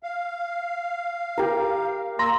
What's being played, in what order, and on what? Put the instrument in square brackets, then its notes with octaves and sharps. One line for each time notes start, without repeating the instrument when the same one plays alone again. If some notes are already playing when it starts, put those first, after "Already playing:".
[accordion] F5
[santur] G4 A#4
[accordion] A#3 E6 [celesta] A#5 C6 A#6